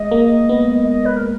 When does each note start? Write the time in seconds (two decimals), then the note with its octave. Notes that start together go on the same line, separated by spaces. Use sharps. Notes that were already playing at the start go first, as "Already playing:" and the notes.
Already playing: G#3 D#5
0.11 A#3
0.49 B3
0.88 D#5
1.05 B4
1.16 A#4